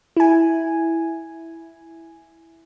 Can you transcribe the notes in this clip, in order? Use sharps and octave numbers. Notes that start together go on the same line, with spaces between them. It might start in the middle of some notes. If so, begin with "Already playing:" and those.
E4 G#5